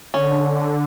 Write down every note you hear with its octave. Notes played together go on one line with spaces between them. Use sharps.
D3 C#4